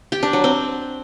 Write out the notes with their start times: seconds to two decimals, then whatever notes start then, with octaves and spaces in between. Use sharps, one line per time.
0.12 G4
0.23 D4
0.33 F#3
0.44 C4